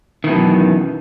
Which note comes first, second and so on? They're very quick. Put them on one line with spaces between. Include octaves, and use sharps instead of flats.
D#3 E3 B2 F#2